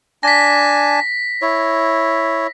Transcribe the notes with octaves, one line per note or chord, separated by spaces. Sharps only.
D4 G#5 A5 A#6 B6
E4 C#5